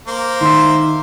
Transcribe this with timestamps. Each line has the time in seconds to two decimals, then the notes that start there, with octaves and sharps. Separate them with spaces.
0.07 A#3 C5
0.41 D#3 E5 C6